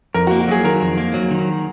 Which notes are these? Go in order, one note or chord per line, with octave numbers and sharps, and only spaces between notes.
F2 A#4
A#3 F#4
F#4
F#3 G#4
D#3 A#4
F2
A#3
F#3
D#3